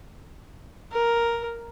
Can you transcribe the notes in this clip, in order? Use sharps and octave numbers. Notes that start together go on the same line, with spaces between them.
A#4